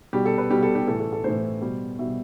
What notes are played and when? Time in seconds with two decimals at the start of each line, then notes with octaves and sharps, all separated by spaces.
0.13 B2 G3 G4
0.26 A4
0.38 B4
0.50 B2 G3 G4
0.63 A4
0.75 G4
0.87 A2 E3 A3 A4
1.00 A4
1.13 A4
1.24 A2 E3 A3 C5
1.61 B2 G3
1.99 B2 G3 E5